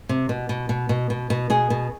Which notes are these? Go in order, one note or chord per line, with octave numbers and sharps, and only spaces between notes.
C3
B2
B2
B2
B2
B2
B2
B2 G#4
B2